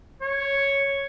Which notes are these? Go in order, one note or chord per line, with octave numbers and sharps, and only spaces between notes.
C#5